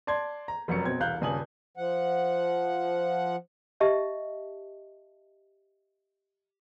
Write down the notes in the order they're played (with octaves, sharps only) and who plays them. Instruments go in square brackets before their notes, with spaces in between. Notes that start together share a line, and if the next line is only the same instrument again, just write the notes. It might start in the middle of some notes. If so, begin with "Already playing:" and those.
[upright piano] D5 A5 C6 G#6
A#5
F1 F#2 F#4 C#7
B2 C4 G#6
E1 C2 F5 F#6 G6
D#1 G2 C#3 G#5 D#6 F#7
[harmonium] F3 F#5
[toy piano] G4 D#5 E5 A5